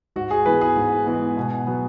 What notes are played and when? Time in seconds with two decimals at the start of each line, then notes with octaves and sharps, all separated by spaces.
0.16 G#2 F#4
0.31 G#4
0.46 E3 G#3 B3 B4
0.61 G#4
0.76 G#2
1.06 E3 G#3 B3
1.37 B2
1.67 F#3 B3